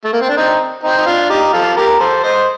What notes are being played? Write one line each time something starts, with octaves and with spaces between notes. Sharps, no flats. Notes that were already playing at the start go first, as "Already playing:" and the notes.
A3
A#3
C4
D4
C4 D#4
C4 D#4
D#4
D4 F4
D#4 G4
F4 A4
G4 A#4
A4 C5
C5 D#5